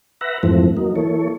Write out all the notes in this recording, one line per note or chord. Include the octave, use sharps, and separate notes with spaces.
B4 E5 F#5 A#5
F2 G#2 E3 F3 A3 C4
F#3 A#3 D#4
E3 A#3 A4 C#5